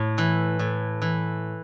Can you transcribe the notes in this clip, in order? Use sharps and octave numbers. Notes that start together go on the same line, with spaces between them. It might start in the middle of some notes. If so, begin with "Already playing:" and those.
Already playing: A2
E3
A2
E3